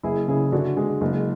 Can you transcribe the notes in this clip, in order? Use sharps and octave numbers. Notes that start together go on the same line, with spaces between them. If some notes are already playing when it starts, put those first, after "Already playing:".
F#1 E4 G#4
C#3 E4 G#4
D3 D4 F#4
G#3
F#1